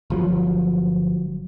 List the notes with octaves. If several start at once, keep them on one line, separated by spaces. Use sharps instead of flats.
G1 F3 F#3